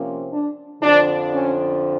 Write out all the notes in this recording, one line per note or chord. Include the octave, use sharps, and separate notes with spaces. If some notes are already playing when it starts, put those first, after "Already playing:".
Already playing: C3 F3 A#3 C#4
D4
F2 D3 F3 D4
C#4